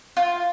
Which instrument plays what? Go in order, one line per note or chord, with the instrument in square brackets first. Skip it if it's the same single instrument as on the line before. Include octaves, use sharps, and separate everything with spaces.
[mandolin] F4